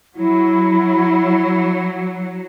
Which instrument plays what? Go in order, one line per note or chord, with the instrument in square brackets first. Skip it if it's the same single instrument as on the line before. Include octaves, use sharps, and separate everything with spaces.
[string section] F#3 [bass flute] E4